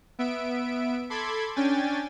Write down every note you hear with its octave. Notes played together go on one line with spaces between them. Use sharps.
B3 E5 D7
A4 B5 C6 D6 G#6
C#4 D4 G5 G#5 A6